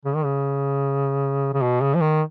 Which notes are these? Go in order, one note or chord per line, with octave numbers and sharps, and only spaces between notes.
C#3
D#3
C#3
C#3
B2
C#3
F3
D#3